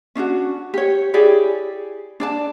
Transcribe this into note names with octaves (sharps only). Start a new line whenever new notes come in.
C#4 D4 E4 F#4
G4 C#5
E4 G4 G#4 D5
D4 D5 A5